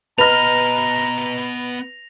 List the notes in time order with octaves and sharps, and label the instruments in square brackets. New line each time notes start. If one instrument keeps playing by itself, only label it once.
[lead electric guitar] B3 D#5 [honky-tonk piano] B4 F6 [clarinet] A#5 [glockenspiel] A#6 F7